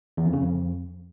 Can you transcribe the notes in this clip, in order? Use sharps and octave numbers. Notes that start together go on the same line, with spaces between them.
E2
F2
C#3
F2